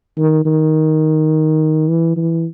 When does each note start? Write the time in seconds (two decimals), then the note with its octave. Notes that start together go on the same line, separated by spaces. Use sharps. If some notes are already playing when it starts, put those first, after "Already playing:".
0.17 D#3
0.45 D#3
1.88 E3
2.16 E3